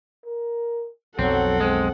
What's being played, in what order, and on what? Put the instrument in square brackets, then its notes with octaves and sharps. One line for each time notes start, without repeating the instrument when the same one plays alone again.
[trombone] A#4
[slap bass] B1 F2 [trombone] F#3 [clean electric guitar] C4 [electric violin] A4 F#5
[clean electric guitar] G#3 [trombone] C4